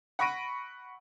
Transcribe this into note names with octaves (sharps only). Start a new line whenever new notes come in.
F#5 B5 C#6 A#6 D7 D#7